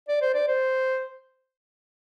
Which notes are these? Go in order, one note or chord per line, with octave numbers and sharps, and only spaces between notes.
D5
C5
D5
C5